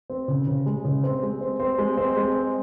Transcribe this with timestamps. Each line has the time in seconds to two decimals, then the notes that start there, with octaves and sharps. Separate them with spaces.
0.10 C4
0.28 C#3
0.47 C#3
0.66 G#3
0.84 C#3
1.04 C4
1.23 G#3
1.41 C4
1.60 C4
1.78 G#3
1.97 C4
2.17 G#3
2.35 C4